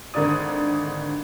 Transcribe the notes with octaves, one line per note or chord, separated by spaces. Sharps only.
G#1 D3 A#4 D5 D#6